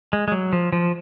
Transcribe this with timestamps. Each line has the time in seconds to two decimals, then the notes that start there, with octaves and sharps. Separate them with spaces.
0.13 G#3
0.28 G#3
0.32 F#3
0.53 F3
0.72 F3